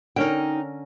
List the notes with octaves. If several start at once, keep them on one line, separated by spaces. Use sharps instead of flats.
D3 C#4 D#4 A#4 G5